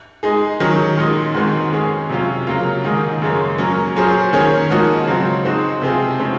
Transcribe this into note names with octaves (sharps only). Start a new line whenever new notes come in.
G#3 D#4 G#4
D#3 F#3 C#4
A#2 G#3 D#4
G#2 D#3 G#3 C4 F#4
G#3 C#4 G#4
C3 F#3 C#4 F4
C#3 F#3 A#3 F4
G#2 D#3 A#3 D#4 G#4
F#2 C#3 G#3 C#4
F#3 A#3 C#4
A#2 F#3 C#4 G#4 C5
D#3 A#3 C#4 G#4 C#5
G#2 F3 A#3 D#4 F#4
C#3 F#3 C4
G#3 C4 D#4 F#4
C3 F3 C4 F4 G#4
C3 F3 G#3 C#4